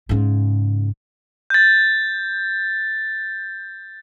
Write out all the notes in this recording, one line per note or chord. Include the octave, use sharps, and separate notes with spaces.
G#2 C#3
G6 A6